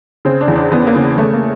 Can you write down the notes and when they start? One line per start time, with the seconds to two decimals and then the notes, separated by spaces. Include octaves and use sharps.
0.25 C#3 C4
0.41 D4
0.48 E2
0.56 D4
0.71 E2 B3
0.87 A#3
0.95 C#3
1.18 C#3 A3
1.33 A#3